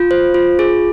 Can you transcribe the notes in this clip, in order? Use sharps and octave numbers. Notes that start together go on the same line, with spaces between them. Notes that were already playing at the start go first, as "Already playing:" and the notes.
Already playing: F4
C5
F4
G#4